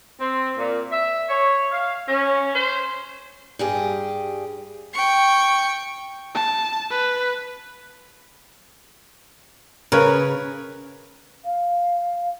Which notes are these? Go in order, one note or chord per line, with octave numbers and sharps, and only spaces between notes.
C4
A#2
E5
C#5
F5
C#4
C5
G2 G4 G#4
G5 C#6
A5
B4
C#3 A#4 B4 C#5
F5